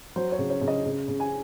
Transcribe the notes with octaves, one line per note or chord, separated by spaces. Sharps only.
F#3 C5
C#5
C#3
C#5
C#3
D#5
C#3
C#3
G#5